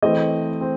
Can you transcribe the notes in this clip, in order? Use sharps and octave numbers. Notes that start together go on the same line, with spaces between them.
E3 A3 C4 D#5
C4